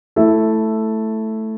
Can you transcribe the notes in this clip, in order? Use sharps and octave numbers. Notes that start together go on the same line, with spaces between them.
A3 E4 A4 E5